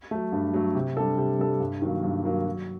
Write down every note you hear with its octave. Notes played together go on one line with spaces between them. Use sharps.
F#3 A3
G2
F#3 A3
C3
G3 D4 A4
C3
G3 D4 A4
G2
D#3 F#3 A#3
G2
D#3 F#3 A#3
F#3